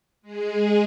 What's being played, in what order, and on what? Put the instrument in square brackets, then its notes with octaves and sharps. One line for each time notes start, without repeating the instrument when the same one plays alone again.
[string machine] G#3 G#4